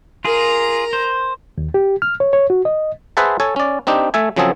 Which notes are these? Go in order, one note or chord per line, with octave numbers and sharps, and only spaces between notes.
F4 G#4 A#4 A#5
C5
D#2
G4
F6
C#5
C#5
F#4
D#5
G#4 B4 C5 E5 F#5 A5
A4 C#5 G#5
C#4 D5
C4 D4 D#4 G4
A3 A4 E5 G#5
C#3 F3 F#3 C4 G#4 A4